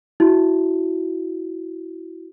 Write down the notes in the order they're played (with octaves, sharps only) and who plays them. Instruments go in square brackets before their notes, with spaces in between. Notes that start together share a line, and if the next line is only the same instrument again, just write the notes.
[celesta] E4 F#4